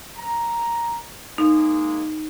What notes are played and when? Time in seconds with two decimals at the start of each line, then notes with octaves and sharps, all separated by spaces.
0.17 A#5
1.38 G#3 A#3 D#4